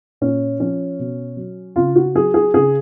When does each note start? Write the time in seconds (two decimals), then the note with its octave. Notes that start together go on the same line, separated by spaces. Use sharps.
0.21 A#2 C#4
0.60 F3 C#4
0.99 B2
1.37 F#3
1.76 C#3 F4
1.96 F#4
2.15 F#3 G#4
2.34 G#4
2.54 C#3 G#4